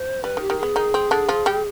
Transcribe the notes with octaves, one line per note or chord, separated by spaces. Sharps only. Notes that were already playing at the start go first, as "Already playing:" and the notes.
Already playing: C5
G3 B4
D#3
G4
D#3
B3 G#4
D#3 D#4
C4
D3 D4
F3 F4
G3 G4